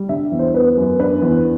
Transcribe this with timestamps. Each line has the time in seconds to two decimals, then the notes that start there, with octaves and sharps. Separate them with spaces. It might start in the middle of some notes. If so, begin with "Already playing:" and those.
Already playing: G3
0.09 D3 E5
0.32 E2
0.39 C5
0.54 B3 B4
0.77 F#2
1.00 D4 B4
1.22 E2